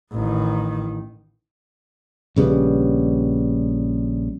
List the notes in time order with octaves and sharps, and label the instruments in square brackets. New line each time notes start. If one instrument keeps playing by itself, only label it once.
[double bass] A1 D#3
[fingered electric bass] A#1 C#3 G3 B3